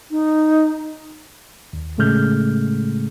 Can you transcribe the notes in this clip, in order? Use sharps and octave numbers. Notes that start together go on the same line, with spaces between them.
D#4
D#2
A2 C#3 G#3 A3 F6 G6